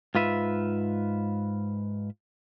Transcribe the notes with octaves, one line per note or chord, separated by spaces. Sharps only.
G#2 F4 B4 E5